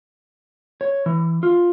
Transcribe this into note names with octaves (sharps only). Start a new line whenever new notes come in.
C#5
E3
F4